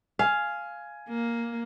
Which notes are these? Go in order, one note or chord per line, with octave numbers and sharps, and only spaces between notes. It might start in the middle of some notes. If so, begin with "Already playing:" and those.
F5 G#5
A#3